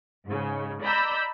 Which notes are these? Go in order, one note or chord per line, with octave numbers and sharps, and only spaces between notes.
G#2 C#3
D5 D#5 A#5 B5 E6 G6